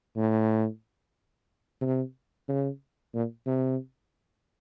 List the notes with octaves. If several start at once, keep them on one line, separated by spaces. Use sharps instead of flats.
A2
C3
C#3
A#2
C3